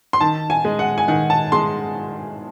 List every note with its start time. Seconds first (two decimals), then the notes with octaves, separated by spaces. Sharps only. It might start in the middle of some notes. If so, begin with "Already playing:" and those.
0.13 C6
0.21 D#3 A5
0.50 G#5
0.65 G#3
0.79 F#5
0.98 G#5
1.08 D#3 F#5
1.30 A5
1.52 G#3 C6